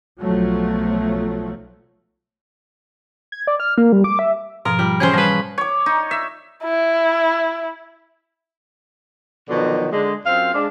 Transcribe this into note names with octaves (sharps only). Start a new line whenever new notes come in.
B1 F3 F#3 A3
G#6
D5
F6
A#3
G3
D6
E5
G#2 B2 F3 A#4
G3 F4
E3 C#4 G#4 C5
F3 G3 B4
C#5 D6
D#4
E5
E4
B2 D3 D#3 F3 F#3
D3 G#3
F#2 C4 F4 F5
G#3 D4